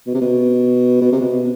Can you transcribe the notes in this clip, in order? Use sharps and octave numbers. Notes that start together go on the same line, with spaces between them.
B2
C3
B2
B2
C3
B2